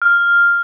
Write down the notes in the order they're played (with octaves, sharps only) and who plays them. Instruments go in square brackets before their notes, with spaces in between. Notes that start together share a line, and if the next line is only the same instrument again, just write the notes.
[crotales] F6